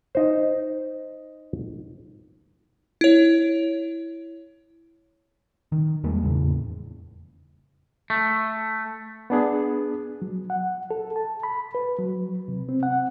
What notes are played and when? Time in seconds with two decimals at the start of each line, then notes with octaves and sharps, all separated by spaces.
0.15 D#4 C5
3.01 E4 C#5
5.72 D#3
6.03 E2 G3 G#3 A#3
6.23 F1 E2 A2 C#3
8.10 A3
9.30 B3 D4 G#4
10.22 F#3
10.50 F#5
10.91 A4
11.16 A5
11.43 B5
11.75 B4
11.99 F#3
12.48 C3
12.69 C4
12.83 F#5